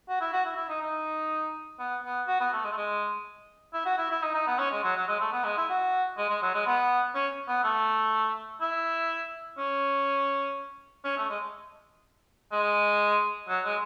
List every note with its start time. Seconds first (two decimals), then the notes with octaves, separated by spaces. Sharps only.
0.09 F#4
0.21 E4
0.33 F#4
0.45 E4
0.56 E4
0.69 D#4
0.82 D#4
1.79 B3
2.04 B3
2.27 F#4
2.40 B3
2.53 A3
2.64 G#3
2.71 A3
2.77 G#3
3.73 E4
3.85 F#4
3.98 E4
4.11 E4
4.23 D#4
4.34 D#4
4.47 B3
4.59 C#4
4.71 G#3
4.84 F#3
4.96 F#3
5.07 G#3
5.20 A3
5.32 B3
5.44 G#3
5.57 E4
5.69 F#4
6.18 G#3
6.30 G#3
6.42 F#3
6.54 G#3
6.66 B3
7.15 C#4
7.48 B3
7.63 A3
8.61 E4
9.58 C#4
11.04 C#4
11.17 A3
11.29 G#3
12.52 G#3
13.48 F#3
13.65 G#3